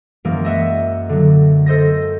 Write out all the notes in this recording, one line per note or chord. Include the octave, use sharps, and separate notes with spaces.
F#2 E3 G#3 A#3
D#5 E5 F#5
D3 F#3
A4 C5 D#5 A#6